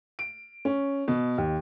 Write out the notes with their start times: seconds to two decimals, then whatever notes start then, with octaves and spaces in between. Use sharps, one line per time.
0.19 D7
0.65 C#4
1.08 B2
1.38 D#2